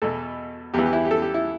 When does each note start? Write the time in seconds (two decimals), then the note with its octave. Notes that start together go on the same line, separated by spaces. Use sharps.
0.02 E2 B2 A4
0.74 E2 E3 G4
0.86 G4
0.93 E4
1.05 G4
1.11 A4
1.22 G4
1.34 E4